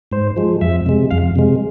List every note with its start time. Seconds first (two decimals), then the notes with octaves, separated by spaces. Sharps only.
0.12 G#2 C5
0.36 F3 G#3
0.61 F2 E5
0.86 C3 G#3
1.11 F2 F5
1.36 C3 G#3